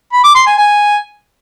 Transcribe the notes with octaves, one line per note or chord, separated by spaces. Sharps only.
B5
D6
C6
G#5
G#5